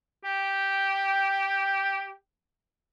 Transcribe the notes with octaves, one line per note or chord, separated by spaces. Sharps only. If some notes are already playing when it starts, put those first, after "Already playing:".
G4 G5